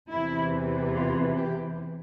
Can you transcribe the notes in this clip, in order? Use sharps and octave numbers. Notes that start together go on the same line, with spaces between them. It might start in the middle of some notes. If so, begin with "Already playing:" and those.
E2 C3 E3 E4
F4
G4